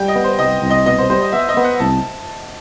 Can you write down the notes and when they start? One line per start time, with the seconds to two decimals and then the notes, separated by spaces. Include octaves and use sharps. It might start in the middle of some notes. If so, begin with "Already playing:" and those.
Already playing: G3 G5
0.08 D#5
0.16 B3
0.24 C5
0.39 C2 D#5
0.62 C2
0.70 D#5
0.86 B2 D#5
0.98 C5
1.10 G3 C5
1.22 D#5
1.32 B3 E5
1.49 D#5
1.57 B3
1.64 F#5
1.80 C2 A5